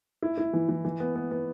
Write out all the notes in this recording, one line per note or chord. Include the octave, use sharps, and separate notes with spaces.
E4
E4
E3
E3
E3
B3
B3
B3